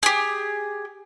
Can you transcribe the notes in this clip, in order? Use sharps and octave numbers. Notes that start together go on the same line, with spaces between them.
G4 G#4